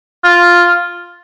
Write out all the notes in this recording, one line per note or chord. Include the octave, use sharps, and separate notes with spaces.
F4